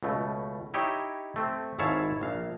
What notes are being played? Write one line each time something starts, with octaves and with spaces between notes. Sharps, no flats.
C#2 B2 A3
D#4 E4 G4 C#5 D#5
A3 C4
G#1 G#2 E4 C#5 F5 A5
A#1 F5